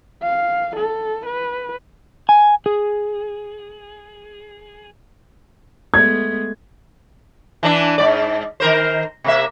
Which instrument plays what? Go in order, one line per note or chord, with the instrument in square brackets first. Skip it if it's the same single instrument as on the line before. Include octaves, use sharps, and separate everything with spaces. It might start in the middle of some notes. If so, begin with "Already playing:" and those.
[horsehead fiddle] F5
A4
B4
[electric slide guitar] G#5
G#4
[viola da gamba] G#3 A3 B3 [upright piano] G#6
[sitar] E3 D4
G#2 D5
D#3 A#4 C5
C3 A#3 E5